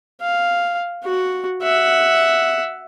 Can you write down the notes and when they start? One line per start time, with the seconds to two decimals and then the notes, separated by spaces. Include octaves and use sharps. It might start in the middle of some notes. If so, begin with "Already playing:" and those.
0.22 F5
1.04 F#4
1.62 E5 F#5